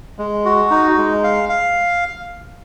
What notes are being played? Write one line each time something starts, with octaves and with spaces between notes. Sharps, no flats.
G#3
F#4
D#4
G#3
F5
F5